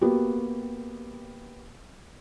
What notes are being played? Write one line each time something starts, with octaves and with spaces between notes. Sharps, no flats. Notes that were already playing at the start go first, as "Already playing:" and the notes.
A#3 B3 F#4 G4